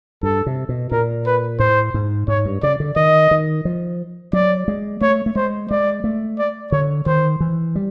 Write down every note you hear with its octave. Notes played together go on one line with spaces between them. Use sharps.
G2 A4
C3
B2
A#2 A#4
B4
A2 C5
G#2
G#2 C#5
G2
C#3 D5
D3
D#3 D#5
D#3
F3
F#3 D5
G#3
A3 C#5
A3
G#3 C5
G#3 D5
A3
D5
D3 C#5
D#3 C5
E3
G3